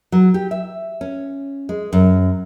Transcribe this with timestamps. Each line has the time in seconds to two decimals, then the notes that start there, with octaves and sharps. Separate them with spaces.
0.12 F#3
0.34 G4
0.51 E5
1.01 C#4
1.69 G#3
1.93 F#2